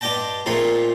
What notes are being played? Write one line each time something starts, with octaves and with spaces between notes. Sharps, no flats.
G2 G4 D5 D#5 G5 A5
A#2 F3 A3 C4 D#4 G#4